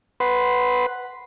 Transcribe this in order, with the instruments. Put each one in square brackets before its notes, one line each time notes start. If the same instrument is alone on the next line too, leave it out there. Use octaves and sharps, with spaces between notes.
[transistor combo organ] B4 F#5 B5 C6